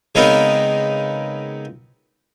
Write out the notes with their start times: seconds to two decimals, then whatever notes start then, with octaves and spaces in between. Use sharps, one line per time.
0.15 C#3 G#3 B3 C4 D#4 A#4